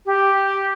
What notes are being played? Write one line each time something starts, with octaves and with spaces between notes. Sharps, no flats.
G4